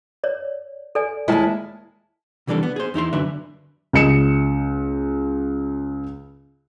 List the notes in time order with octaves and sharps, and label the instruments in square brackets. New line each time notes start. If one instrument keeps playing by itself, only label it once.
[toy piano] C#5 D5
A4 D5 G#5
[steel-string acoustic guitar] D#2 G#3 [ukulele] E4 A#4 A5
[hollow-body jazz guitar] C3 E3 G3 D4 A4
B3
G#4 C5
E2 D#4 E4 C6
F#2 D3 D4 B4 E5
[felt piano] C#2 D#5 C#7 E7